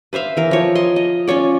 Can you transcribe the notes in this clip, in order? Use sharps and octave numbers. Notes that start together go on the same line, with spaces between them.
B4 C5 E5 F5
E3 A#4
F3 C#5
D#5 C6
D#5
C#4 F4 C#5 D5